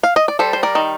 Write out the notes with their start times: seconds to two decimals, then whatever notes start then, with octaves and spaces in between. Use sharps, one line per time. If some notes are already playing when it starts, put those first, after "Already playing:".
0.03 F5
0.16 D#5
0.28 D5
0.39 G3 A4 C5
0.53 C5
0.63 A#4 D5
0.75 D#3